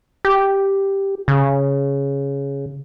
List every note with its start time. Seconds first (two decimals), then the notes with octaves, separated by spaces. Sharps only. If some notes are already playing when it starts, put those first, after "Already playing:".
0.25 G4
1.28 C#3